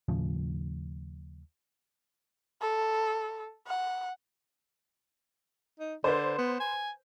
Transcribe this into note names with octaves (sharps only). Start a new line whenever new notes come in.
D#2 A2 C#3 F3
A4
F#5
D#4
D3 B4 C5
B3
G#5